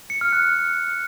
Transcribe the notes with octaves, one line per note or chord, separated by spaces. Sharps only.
C#7
F6
F#6